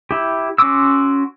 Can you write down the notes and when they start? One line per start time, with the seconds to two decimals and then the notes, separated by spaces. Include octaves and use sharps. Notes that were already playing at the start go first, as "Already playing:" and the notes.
0.11 E4 G4
0.58 C#4 F#4 C6 D6 E6